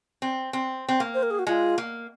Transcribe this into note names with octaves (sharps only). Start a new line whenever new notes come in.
C4
C4
C4
A#3
C5
A#4
G#4
F#4
G#3 F4
A#3